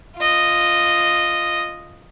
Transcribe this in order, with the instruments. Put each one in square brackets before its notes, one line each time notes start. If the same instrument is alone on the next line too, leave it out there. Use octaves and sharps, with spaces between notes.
[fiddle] F4 D#5